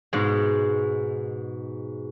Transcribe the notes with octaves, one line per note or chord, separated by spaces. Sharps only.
G#2 B2 G#3